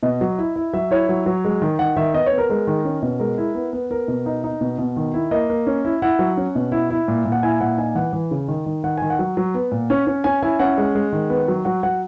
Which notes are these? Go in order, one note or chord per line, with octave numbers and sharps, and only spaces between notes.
B2 D#5
F#3
E4
E4
F#3 E5
E4 C#5
F#3
F#3
G#3
D#3
D#3 F#5
D#3 E5
B3 D#5
C#5
B3
A#4
G#3 A#4
D#3
C#4
B2
G#3 A#4
E4
B3
B3
B3 A#4
B2
D#4
D#4
B2
B2
D#3
E4
A#3 D#5
A#3
C#4
E4
E4 F#5
F#3
C#4
B2
E4
E4
A#2
A#2
F#5
E4 G#5
A#2 F#5
D#4 G#5
E3 F#5
E3
C#3
D#3
D#3
D#3 F#5
D#3 G#5
F#5
F#3
F#3
B3
A#2
C#4
C#4
C#4 G#5
E4 G#5
C#4 F#5
G#3
G#3
D#3
B3
F#3
F#3 F#5
F#3 F#5